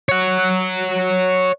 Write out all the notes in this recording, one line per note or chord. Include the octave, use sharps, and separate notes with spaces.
C#5 F#5